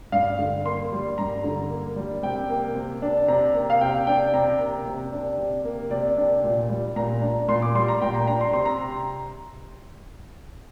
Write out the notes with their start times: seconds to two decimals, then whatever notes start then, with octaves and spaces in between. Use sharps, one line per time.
0.12 G2 F5
0.39 D3
0.65 A#3 C6
0.92 G3
1.18 G2 A#5
1.44 D3
1.70 A#3
1.96 G3
2.23 C3 G5
2.49 A#3
2.75 C3
3.02 D4
3.28 C3 A#5
3.55 A#3
3.70 F5
3.81 C3 G5
4.07 D4 G5
4.34 C3 A#5
4.59 A#3
4.85 C3
5.12 D4
5.38 C3
5.64 A#3
5.90 C3 D5
6.17 D4
6.44 A#2
6.69 G3
6.96 A#2 A#5
7.22 D4
7.48 A#2 C6
7.62 D6
7.75 G3 C6
7.88 A#5
8.01 A#2 G5
8.15 A#5
8.27 D4 A#5
8.41 C6
8.53 C3 C6
8.65 A#5